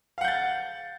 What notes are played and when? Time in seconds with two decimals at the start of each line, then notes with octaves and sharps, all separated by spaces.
0.18 F5
0.21 F#5
0.24 G6
0.28 A6